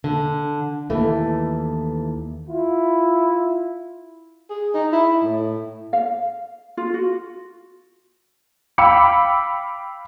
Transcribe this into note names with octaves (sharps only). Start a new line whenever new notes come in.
D3
D#2 E3 A3
E4 F4
G#4
D#4
E4
A2
F5
F4
F#4
F5 G5 B5 D6 E6 C#7